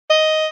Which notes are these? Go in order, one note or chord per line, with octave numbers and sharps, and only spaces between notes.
D#5